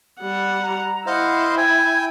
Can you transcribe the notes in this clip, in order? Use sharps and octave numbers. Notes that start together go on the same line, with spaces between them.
G3 F#5
A#5
E4 C5 D#5 F5 F#5
G5 G#5 G#6